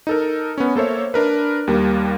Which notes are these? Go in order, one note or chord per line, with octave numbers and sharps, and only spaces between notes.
D#4 A4 A#4
B3 C#4
A#3 A4 C5 C#5 E5
D4 A#4 B4
D#2 G3 A#3